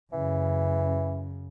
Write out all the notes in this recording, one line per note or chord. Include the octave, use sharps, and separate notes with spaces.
F#2 C#3 E3